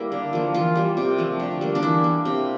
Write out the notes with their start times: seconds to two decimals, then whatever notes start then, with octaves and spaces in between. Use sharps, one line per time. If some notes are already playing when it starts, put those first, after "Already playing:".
Already playing: G3 A#3 E4
0.12 D3
0.33 F3 A#3
0.54 E3 F4
0.75 G3 A#3
0.97 C3
1.18 F3 A3
1.40 D3
1.61 G3 A#3
1.75 D4
1.82 E3 E4
2.04 A#3
2.25 C3